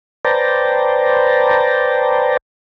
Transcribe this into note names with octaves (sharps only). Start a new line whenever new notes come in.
B4 C5 D5 G5 A5 A#5